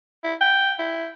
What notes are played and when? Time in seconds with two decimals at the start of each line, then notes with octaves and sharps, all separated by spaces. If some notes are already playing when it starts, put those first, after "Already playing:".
0.23 E4
0.41 G5
0.79 E4